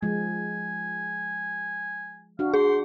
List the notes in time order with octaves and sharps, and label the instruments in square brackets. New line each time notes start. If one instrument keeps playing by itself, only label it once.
[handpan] F3 G#3 [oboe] G#5
[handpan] D4 F#4 [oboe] F5
[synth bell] G#4 [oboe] C6